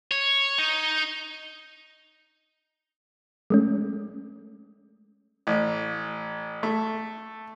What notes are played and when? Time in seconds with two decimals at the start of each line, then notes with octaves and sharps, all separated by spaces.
0.11 C#5
0.58 D#4
3.50 G#3 A3 C#4
5.47 A1
6.63 A3